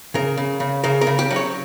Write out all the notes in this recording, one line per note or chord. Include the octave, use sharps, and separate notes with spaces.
C#3 A#4
C#3
C#3
C#3 A#4
A#4
C#3
G4
F#3
C#5